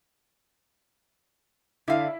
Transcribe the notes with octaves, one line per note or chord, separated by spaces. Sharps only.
D3 E4 F5